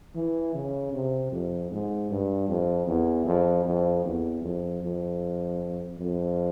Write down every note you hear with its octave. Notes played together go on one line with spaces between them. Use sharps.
E3
C#3
C3
F2
G#2
G2
F2
E2
F2
F2
E2
F2
F2
F2